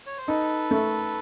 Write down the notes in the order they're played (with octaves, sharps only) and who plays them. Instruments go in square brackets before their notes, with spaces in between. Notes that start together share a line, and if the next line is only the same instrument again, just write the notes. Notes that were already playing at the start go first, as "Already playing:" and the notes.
[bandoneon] C#5
C5
[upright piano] D#4 [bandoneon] A4 B4
[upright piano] A3